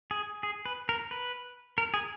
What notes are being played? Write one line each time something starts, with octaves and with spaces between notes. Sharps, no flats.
G#4
G#4
B4
A#4
B4
A#4
G#4